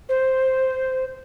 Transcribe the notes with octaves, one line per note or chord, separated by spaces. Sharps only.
C5